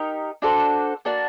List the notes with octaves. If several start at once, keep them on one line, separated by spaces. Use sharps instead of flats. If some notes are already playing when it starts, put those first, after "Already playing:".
Already playing: D#4 G4 A#4 D#5
D4 F#4 A4 C5
A#3 D4 F#4